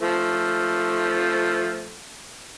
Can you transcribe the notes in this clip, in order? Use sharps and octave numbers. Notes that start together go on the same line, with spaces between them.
F3 A3